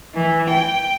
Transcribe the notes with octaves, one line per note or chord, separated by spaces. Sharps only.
E3
G5